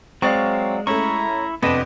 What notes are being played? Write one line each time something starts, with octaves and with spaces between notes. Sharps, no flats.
F#3 G#3 C4 D5 F5 C#6
A3 C#4 E4 A#5 C#6
F2 C3 B3 D4 B4 D#5